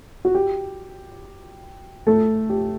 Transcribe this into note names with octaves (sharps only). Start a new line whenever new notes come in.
F#4
G4
A3 A4
G4